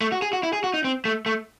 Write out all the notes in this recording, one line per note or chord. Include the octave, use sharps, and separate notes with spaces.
A3
F#4
G#4
F#4
E4
G#4
F#4
D#4
C4
A3
A3